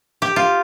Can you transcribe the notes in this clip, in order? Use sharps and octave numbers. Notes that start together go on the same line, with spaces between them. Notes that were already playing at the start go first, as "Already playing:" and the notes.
G4
F4